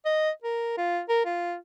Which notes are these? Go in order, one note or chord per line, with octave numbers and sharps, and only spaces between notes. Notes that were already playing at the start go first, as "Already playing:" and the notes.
D#5
A#4
F4
A#4
F4